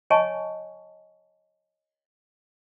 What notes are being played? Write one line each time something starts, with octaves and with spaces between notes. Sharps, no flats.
C#5 D#5 G#5 A5 C#6